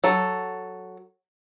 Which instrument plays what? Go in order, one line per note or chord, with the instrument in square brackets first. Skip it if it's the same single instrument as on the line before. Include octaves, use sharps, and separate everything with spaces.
[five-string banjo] F#3 A4